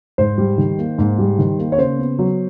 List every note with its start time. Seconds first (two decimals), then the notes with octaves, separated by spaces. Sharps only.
0.18 G#2 C5
0.38 G3
0.58 D#3
0.79 A#3
0.98 G#2
1.18 G3
1.39 D#3
1.59 A#3
1.72 C#5
1.78 C#3 C5
1.99 B3
2.19 F#3